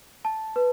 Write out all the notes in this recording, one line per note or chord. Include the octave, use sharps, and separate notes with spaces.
A5
B4